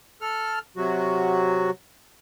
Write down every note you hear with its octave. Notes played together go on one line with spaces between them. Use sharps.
A4 F6
C3 F#3 F#4